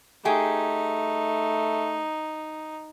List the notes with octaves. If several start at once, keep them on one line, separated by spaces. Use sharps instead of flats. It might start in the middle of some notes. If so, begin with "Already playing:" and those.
A3 D#4 G4 G#4